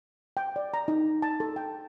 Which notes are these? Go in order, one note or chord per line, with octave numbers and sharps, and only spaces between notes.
G5
D5
A#5
D#4
A5
A4
G5